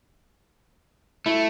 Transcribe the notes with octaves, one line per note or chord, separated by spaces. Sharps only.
A3 E4